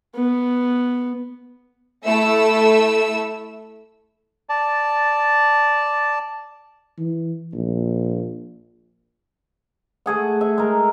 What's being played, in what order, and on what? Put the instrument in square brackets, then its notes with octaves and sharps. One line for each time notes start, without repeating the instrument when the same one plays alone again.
[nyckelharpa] B3
[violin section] A3 E4 A4 E5 E6
[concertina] D5 A5
[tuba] E3
A#1
[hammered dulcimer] A3 G#4 F#5
E5
G#3 A#4